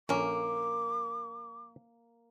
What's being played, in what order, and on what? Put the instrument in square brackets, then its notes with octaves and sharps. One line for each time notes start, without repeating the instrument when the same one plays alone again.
[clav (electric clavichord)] A#1 C#4 [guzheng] A#3 [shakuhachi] D6